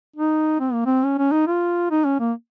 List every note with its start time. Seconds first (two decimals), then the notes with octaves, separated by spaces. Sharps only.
0.16 D#4
0.59 C4
0.73 A#3
0.86 C4
1.04 C#4
1.18 C#4
1.32 D#4
1.47 F4
1.91 D#4
2.05 C#4
2.19 A#3